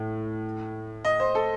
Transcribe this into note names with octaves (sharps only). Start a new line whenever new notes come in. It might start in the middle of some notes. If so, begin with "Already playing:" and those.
Already playing: A2
D#5
C5
A4